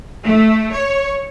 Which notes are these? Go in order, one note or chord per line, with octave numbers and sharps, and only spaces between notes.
A3
C#5